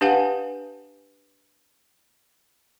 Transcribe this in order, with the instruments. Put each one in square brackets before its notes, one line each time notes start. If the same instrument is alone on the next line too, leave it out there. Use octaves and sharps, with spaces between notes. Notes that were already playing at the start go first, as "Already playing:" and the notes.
[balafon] D4 G4 B4 F5 F#5 G#5